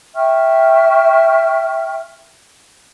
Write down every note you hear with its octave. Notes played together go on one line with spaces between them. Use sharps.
E5 G5 C#6 F6